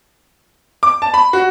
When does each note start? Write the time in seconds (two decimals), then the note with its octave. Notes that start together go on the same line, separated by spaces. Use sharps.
0.83 D6
1.02 A5
1.14 B5
1.33 F#4